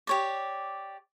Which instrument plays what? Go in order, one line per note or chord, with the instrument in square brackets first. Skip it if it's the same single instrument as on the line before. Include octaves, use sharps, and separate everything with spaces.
[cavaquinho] G4 C#5 D5